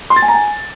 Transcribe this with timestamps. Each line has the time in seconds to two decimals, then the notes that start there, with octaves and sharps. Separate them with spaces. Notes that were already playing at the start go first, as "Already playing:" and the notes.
0.10 C6
0.16 A6
0.22 G#5
0.28 A#5
0.34 G#5